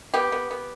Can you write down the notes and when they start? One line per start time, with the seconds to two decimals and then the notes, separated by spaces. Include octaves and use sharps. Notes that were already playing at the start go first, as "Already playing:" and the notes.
0.14 B3 G4
0.32 B3
0.51 B3